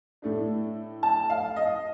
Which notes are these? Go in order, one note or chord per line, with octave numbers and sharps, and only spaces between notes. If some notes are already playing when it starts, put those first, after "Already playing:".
A2 A3 D4
A5
F5
D#5